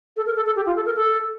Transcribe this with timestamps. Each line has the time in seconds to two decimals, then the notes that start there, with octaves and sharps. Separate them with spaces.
0.17 A4
0.26 A#4
0.36 A4
0.46 A4
0.56 G4
0.66 F4
0.76 A4
0.86 A#4
0.96 A4